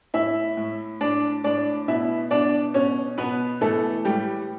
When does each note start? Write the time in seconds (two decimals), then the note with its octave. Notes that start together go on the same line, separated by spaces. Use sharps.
0.14 A2 E4 E5
0.57 A2
1.01 A2 D4 D5
1.44 A2 D4 D5
1.88 B2 E4 E5
2.31 B2 D4 D5
2.74 B2 C#4 C#5
3.18 B2 B3 B4
3.61 E3 A3 A4
4.05 A2 G3 G4